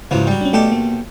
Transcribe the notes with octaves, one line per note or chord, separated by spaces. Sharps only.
E2 G#2 C#3 F3 F#3
F#3 G3
C#4 D4
B1 A3 G4 A4 D5 D#5
A#3